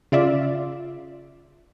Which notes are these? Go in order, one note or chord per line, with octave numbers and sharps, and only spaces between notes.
C#3 F4 D5 E5